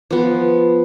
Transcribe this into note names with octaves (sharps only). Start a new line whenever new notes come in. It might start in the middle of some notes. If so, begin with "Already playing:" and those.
F3 B3